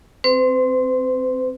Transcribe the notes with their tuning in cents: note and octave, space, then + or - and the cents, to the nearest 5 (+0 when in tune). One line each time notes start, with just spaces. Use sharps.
C4 +0 C5 -45